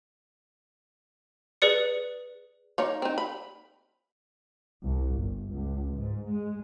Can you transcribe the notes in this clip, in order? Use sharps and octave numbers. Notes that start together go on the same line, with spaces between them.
G#4 B4 D5 C#7
A#3 D#4 C#5
C4 D#4
B5
C2
G1
C#2
G#2
G#3